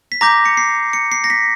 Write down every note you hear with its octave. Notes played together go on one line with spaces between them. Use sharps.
B6
A#5 D6 G6 A#6
C#7
C7
C#7
C7
A#6
B6